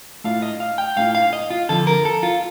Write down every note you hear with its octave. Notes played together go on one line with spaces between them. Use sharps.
A2 A3 D4 F4 F5
D#5
F5
G5
A2 A3 D4 F4 F5
F5
D#5
F4
F2 D3 F3 A4
A#4
A4
F4